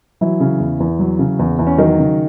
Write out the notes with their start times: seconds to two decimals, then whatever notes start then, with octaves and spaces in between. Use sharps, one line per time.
0.21 E3 F#3 E4
0.40 C#3
0.60 E2
0.80 E2
0.99 F#3
1.19 C#3
1.39 E2
1.59 E2
1.67 C#4
1.78 D#3 F#3 D#4
1.99 C#3